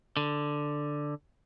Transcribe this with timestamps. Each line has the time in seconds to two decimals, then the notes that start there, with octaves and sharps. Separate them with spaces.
0.17 D3